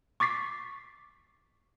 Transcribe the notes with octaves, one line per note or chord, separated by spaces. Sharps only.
C#6 D6 A6 B6 C7